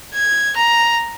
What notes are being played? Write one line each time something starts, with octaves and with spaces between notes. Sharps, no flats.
G#6
A#5